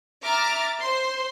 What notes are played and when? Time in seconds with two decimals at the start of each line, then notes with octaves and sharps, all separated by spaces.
0.22 E5 A#5 D6 F6 A6
0.80 C5 C6